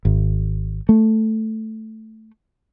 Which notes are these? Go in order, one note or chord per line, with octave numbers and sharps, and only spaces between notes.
G#1
A3